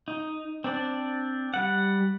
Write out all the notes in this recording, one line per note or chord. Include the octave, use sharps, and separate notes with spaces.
D#4
C4 D4 D5
G3 F#5